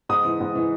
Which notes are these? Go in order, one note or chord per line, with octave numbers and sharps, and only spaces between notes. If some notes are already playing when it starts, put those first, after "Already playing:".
G#2 D#6
E3
G#2
E3